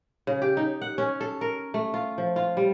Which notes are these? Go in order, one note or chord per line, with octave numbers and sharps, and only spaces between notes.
C#3
G4
D#4
F#5
C#4
A4
A#4
A3
F4
F3
F4
G3